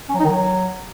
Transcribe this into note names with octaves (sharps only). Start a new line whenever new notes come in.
C#4
F#3
D#4
D#3
F#3